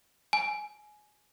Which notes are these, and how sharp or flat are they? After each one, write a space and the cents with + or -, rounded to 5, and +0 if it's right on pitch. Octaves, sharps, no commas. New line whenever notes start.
G#5 +20